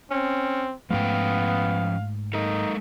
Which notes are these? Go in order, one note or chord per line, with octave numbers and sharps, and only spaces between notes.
C4 C#4
G#2 F3 A3 B3 C#4 F5 G5
G#3 D#4 A4 A#4